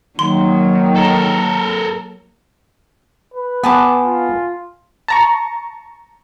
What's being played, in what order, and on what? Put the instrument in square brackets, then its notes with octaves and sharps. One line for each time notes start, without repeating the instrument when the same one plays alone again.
[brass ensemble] D#3 [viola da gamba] F#3 A#3 [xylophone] C6
[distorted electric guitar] A4 A#4
[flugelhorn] B4
[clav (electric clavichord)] B3 [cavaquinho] G#5 A5 D6
[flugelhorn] F4
[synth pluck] A5 A#5 C#6